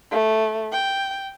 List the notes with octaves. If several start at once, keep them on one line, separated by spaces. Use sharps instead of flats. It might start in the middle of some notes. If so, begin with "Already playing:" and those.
A3
G5